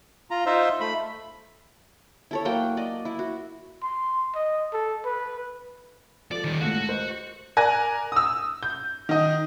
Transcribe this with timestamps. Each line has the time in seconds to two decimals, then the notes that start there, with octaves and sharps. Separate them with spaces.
0.31 F4 A#5
0.46 D#4 F4 C5 E5
0.81 A3 B5
2.31 E4 A4 C#5
2.45 F#3 A#3 F#5 G5
2.77 D5 D#5
3.05 E4
3.19 F#4
3.83 C6
4.35 D#5
4.74 A4
5.05 B4
6.31 F3 A4 D5
6.44 D#3 G3
6.61 C#2 A2 A3 F#4
6.89 C5 D#5
7.57 A#4 D5 G#5 F#6 A#6
8.12 D#6 E6
8.63 G6
9.09 D#3 D#5